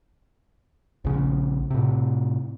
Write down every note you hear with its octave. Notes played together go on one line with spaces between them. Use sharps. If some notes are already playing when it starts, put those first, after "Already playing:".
A#1 C#3
A2 C3